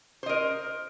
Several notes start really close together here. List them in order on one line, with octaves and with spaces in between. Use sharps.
C5 D#5 A#4